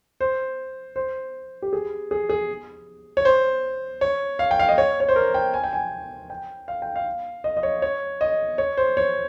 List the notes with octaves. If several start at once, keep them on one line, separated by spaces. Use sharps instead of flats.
C5
C5
G4
G#4
G#4
G#4
C#5
C5
C#5
F5
G5
F5
D#5
C#5
C#5
C5
A#4
G5
G#5
G5
G#5
G5
F5
G5
F5
D#5
D#5
C#5
C#5
D#5
C#5
C5
C#5